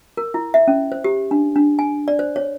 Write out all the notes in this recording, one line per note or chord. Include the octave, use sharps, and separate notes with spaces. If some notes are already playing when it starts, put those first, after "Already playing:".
A#4
E4
E5
C#4
C5
G4
D4
D4
G#5
D5
C5
C#5